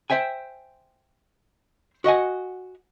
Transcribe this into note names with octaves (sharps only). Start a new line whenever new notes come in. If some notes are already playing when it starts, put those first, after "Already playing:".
C5 E5 G5 G#5
F#4 D#5 F#5 G#5